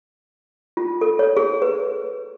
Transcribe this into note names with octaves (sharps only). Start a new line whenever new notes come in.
F4
A4
C#5
G#4
B4